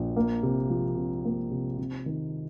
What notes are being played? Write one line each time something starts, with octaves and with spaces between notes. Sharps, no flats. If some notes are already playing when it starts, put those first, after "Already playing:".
Already playing: A#1
A#3
C3
F3
C3
A#3
C3
C3
D#3